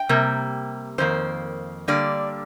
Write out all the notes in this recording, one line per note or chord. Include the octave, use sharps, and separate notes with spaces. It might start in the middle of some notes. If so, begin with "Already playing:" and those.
Already playing: G5
C3 G3 A#3
F2 D#3 A#3 C5
D3 G3 A#3 D5